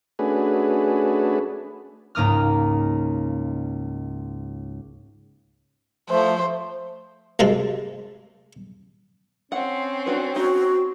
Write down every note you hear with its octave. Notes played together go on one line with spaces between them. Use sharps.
A3 C#4 D4 F#4 G#4 B4
C#2 G#2 A#3 D#6 F6
F3 A3 C5
F#2 C3 G#3 A3
C4 C#4 F#5
D4 F#4 B4
D#4 F#4